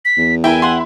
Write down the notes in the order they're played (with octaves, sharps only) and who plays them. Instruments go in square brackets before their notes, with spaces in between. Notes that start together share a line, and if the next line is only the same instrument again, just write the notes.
[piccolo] B6
[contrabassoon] E2
[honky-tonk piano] E4 [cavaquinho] A#4 G5 [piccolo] G#5
[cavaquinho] F#5 C6